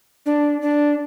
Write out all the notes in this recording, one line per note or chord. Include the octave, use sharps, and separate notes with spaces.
D4
D4